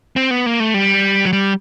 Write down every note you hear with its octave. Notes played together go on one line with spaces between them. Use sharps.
C4
B3
A#3
A3
G3
F#3
G3